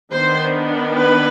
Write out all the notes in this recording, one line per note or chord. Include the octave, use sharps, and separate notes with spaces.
D#3 B3 D4 C5
B4